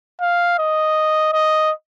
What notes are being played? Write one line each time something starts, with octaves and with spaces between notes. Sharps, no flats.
F5
D#5
D#5